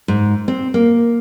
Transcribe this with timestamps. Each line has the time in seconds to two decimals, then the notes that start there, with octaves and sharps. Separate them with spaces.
0.08 G#2
0.48 C4
0.74 A#3